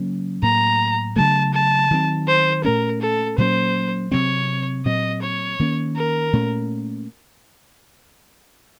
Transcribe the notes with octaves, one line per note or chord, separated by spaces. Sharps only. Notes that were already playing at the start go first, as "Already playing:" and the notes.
Already playing: C#3 F#3 A#3 C#4
A2 F#3 A#3 A#5
C#3 F#3 A3 A5
A5
D#3 F#3 C4
C5
A#2 A3 C#4 A#4
A4
A#2 F#3 A#3 C#4 C5
C3 F#3 C4 C#5
A#2 F#3 C4 D#5
C#5
D#3 A#3 C#4
A#4
A#2 A3 C#4